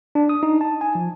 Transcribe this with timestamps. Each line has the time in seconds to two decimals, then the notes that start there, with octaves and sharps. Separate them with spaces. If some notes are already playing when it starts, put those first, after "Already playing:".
0.15 D4
0.29 D#6
0.43 D#4
0.61 A5
0.81 G#5
0.95 F3